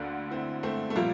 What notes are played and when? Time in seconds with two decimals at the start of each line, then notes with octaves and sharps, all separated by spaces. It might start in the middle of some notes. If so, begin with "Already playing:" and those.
Already playing: D2 D3 A#3 D4
0.30 C4 E4
0.63 A3 C4
0.90 A3
0.95 A#2 F3 G3 A#3